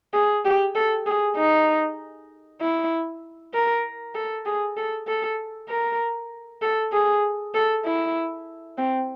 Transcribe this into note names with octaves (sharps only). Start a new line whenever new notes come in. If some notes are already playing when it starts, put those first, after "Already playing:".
G#4
G4
A4
G#4
D#4
E4
A#4
A4
G#4
A4
A4
A#4
A4
G#4
A4
E4
C4